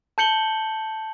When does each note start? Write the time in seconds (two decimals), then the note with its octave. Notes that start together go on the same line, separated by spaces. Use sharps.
0.18 A5 G6 C#7 F#7 G7